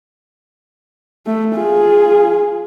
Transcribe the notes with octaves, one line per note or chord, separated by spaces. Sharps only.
A3
F4 G#4